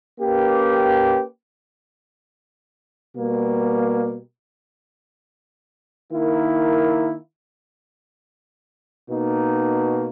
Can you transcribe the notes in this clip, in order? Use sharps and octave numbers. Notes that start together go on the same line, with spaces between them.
A#3 C#4 G4 B4
B2 G3 A#3
D#3 A#3 E4
B2 A#3 D#4